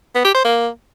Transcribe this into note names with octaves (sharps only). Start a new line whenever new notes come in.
B3
G4
C5
A#3